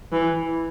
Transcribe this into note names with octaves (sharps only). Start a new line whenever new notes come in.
E3